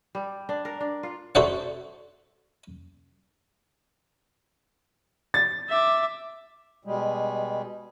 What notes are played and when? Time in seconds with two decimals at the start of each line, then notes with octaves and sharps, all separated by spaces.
0.15 G3
0.49 D4
0.65 A#4
0.80 D4
1.03 F4
1.35 F#4 A4 C5 D5 E5 F#5
5.34 A6
5.69 E5 D6
6.85 B2 G3 G#3